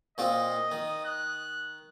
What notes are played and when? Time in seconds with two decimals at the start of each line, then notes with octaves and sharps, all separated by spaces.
0.18 A#2 C4 F4 D#5
0.72 D#3
1.05 F#6